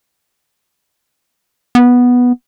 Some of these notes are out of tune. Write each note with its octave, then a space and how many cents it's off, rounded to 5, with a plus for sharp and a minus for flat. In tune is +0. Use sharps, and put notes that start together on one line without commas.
B3 -5